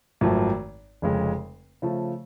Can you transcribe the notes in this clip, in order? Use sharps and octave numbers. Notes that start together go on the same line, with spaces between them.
G#1 F#2 F3 A3
F1 F2 C#3 G#3
C#3 F3 A3